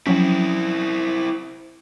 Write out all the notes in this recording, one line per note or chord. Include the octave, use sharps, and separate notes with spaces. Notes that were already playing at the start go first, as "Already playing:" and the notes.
F3 F#3 C4 C#4 E4